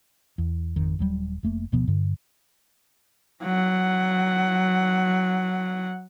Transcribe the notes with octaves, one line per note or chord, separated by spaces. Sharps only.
E2
G#1 F2 D#3
D#1 F#3 G3
F1 A3 A#3
D1 B2 F3 B3
G2 D3
F#3 F#5